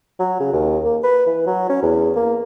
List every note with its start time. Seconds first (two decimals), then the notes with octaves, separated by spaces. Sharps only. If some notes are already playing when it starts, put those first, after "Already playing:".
0.19 F#3
0.40 C#3
0.53 D#2
0.85 A#3
1.04 B4
1.26 E3
1.47 F#3
1.70 C#4
1.83 E2
2.16 A#3